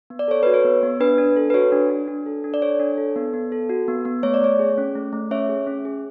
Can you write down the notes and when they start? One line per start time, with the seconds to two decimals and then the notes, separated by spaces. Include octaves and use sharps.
0.10 B3
0.19 D5
0.28 A4 C#5
0.43 F#4 B4
0.54 C#5
0.65 B3
0.83 B3
1.00 D4 B4
1.18 D4
1.36 A4
1.50 B4
1.54 F#4 C#5
1.72 D4
1.90 D4
2.08 D4
2.26 A4
2.44 D4
2.54 D5
2.62 A4 C#5
2.80 D4
2.98 A4
3.16 B3
3.34 B3
3.52 A4
3.69 F#4
3.88 B3
4.05 B3
4.23 A3 C#5
4.34 D5
4.42 A3 C#5
4.59 G#4
4.78 C#4
4.95 A3
5.13 A3
5.31 C#4 C#5 E5
5.49 G#4
5.67 C#4
5.85 G#4